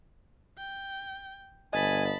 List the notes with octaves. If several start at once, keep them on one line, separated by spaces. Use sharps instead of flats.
G5
G1 D#5 G#5 A5 B5